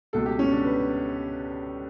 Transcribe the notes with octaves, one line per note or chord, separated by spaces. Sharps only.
C#2 B2 A3 A4
G4
C#4
D4
B4